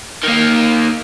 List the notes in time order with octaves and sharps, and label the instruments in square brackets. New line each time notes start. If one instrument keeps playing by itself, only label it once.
[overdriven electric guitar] D#3 A#3